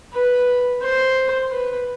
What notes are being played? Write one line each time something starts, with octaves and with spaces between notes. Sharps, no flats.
B4
C5
B4